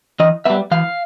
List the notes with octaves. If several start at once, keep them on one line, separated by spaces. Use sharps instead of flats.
E3 D#5
G3 B3 E5
E3 F5